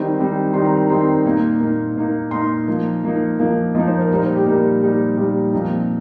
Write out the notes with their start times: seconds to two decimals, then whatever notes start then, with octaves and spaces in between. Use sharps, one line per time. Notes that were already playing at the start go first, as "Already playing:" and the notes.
Already playing: D#3 G3 C4 D#4 C5
0.18 D#3 G3 C4 D#4
0.53 D#3 G3 C4 D#4 C6
0.65 A#5
0.77 A#5
0.89 D#3 G3 C4 D#4 C6
1.25 A#2 A#3 D#4
1.61 A#2 A#3 D#4
1.96 A#2 A#3 D#4
2.31 A#2 A#3 D#4 C6
2.68 F3 A#3 D#4
3.03 F3 A#3 D#4
3.39 F3 A#3 D#4
3.74 F3 A#3 D#4 D#5
3.87 C5
4.01 A#4
4.10 A#2 G3 D#4 C5
4.36 G4
4.45 A#2 G3 D#4 A#4
4.81 A#2 G3 D#4
5.17 A#2 G3 D#4
5.53 A#2 F3 C4 D#4